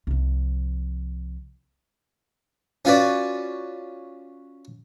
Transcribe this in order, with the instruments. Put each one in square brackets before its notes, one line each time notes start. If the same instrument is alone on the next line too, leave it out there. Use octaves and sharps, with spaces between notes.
[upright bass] C2 F3
[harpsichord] C#4 F4 F#4 B4 D5